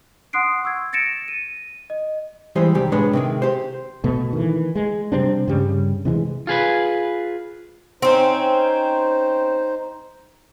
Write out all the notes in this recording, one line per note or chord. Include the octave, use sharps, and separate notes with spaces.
F#5 C6 D#6 F#6 C7 D7
C#6 E6 G#6
A6 A#6 C#7 D7 E7
D#7
D#5
E3 G3 G#3 G4 C5
C2 D#3 G4
A2 G#3 D4 B4 C#5
C3 D#3 G#3
G4 C5
B2 A3
D#3 E3
G#3
C3 G3 C4 D4
G2 C#3 G3
C3 E3 F3 G#3
F4 G#4 B4
C4 C#4 D#4 C5